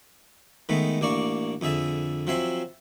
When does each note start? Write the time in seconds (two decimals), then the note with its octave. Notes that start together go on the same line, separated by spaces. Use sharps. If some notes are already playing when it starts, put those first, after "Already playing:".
0.69 D#3 G#3 A3 B3
1.01 A1 A#3 D4 D5 C#6
1.61 F2 D3 G#4 E5 A5
2.27 F3 F#3 C4 E5 G#5 C6